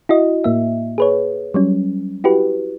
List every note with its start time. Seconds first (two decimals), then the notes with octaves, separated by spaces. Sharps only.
0.09 E4 F#4 D#5
0.44 A2 A#3 E5
0.98 G#4 B4 C#5
1.54 F#3 G3 C#4
2.24 E4 F#4 G4 B4